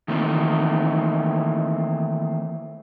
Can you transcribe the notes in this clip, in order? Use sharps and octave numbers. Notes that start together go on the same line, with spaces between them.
D#3 E3 A3 A#3 C4